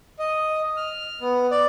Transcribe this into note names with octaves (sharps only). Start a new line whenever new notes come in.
D#5
F6
B3
D5